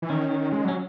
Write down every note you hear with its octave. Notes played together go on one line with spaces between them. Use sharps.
E3
D#3 C#4
G#3
F#3 C#4